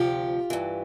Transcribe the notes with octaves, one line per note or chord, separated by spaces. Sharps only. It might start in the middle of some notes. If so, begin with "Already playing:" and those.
Already playing: D2 C3 F3 F4 G4
G2 E3